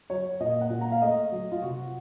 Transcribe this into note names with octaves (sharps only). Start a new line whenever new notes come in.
F#3 C#5
A#2 D#5
F#5
A#2
A#5
F5
A3 D#5
F#3
F4
C3 F#4